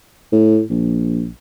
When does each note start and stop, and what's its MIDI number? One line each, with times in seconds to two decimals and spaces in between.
0.33 0.62 45
0.70 1.29 34